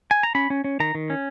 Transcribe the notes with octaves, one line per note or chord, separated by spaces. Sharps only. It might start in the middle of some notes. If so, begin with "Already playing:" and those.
G#5
A#5
C#4 B5
C#4
C#4
D#3 A#5
D#3
C#4